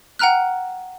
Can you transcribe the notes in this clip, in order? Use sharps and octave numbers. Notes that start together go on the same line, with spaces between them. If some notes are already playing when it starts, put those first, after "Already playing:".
F#5 G5 A#5 F6 F#6